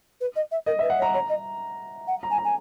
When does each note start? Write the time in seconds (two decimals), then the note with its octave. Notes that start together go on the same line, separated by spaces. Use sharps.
0.21 B4
0.36 D#5
0.51 E5
0.66 A#4 D#5
0.79 B4 E5
0.90 F#5
0.99 C#5
1.02 A#5
1.14 C#5 A#5
1.29 D#5
2.07 F#5
2.23 A#5
2.30 G#5
2.38 A#5
2.44 G#5